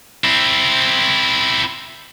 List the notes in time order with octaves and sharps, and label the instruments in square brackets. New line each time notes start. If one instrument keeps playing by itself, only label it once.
[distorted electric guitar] C4 E4